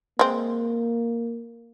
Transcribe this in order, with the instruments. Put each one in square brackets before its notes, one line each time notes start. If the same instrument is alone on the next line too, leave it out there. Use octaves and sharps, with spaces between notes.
[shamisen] G#3 C4 [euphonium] A#3